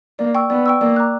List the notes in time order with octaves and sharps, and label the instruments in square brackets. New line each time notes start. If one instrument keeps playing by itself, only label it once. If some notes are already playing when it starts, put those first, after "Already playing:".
[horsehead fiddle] A#3 [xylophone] D5
[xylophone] G5 C#6 E6
[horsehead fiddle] B3 [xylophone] D5
[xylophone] G5 C#6 E6
[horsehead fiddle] A#3 [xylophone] D5
[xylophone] A#5 D6 F#6